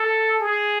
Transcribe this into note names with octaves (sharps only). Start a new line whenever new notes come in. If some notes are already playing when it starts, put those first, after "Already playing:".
Already playing: A4
G#4